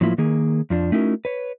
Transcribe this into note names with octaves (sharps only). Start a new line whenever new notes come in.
A2 F3 F#3 A#3 E4 F4
D#3 A#3 G#4
F2 F3 D4
A3 C#4 D#4 E4 F#4 A#4
B4 C#5